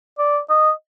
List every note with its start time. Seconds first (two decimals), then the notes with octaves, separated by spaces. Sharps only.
0.18 D5
0.49 D#5